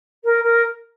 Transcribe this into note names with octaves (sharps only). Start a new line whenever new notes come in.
A#4
A#4